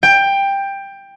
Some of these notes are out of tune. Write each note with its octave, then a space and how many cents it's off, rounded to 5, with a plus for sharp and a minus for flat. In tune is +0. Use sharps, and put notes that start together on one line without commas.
G5 +15